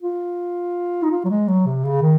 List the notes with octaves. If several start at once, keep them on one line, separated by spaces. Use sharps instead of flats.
F4
D#4
F4
F#3
G#3
F#3
C3
C#3
D#3